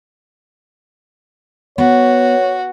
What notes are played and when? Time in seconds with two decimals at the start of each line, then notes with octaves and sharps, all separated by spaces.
1.78 B3 F#4 C#5